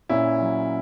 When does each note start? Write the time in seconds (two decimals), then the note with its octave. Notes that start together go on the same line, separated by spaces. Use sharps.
0.09 A#2 C#4 E4
0.41 F#3